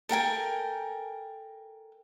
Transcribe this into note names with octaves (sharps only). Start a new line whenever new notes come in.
A4 A#4 G5 G#5